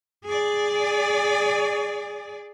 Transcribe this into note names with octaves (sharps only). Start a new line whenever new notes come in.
G#4 D5